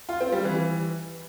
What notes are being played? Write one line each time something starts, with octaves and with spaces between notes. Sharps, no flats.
F4
C4
G3
E3